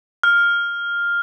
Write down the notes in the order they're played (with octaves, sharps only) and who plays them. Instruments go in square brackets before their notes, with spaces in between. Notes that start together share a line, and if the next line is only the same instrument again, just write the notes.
[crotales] F6